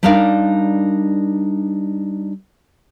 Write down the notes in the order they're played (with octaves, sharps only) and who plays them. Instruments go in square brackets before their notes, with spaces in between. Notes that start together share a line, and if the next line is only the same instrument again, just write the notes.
[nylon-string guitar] G3 D4 D#4 A#4 D5 F5